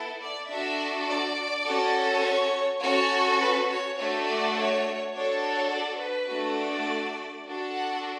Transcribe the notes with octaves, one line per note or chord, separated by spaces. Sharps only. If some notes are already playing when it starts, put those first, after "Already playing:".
Already playing: B3 E4 A4
D5
D4 F#4 A4 E5
D5
C#4 F#4 A4
C#5
C#4 F#4 A4 C#5
B4
C#5
A3 D4 F#4 A4 C#5
D5
C#5
D4 F#4 A4 C#5
C#5
D5
B4
A3 D4 F#4 A4
D5
D4 F#4 A4
F#5